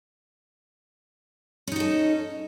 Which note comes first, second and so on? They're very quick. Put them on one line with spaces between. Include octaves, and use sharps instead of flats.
C#4 D#4 F#4 A4